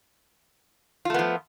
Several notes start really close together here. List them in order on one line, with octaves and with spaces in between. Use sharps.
F4 A3 B3 F3